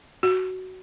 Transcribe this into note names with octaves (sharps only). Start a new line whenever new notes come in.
F#4